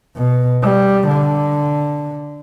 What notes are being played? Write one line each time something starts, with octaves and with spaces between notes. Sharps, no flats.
B2
G3
D3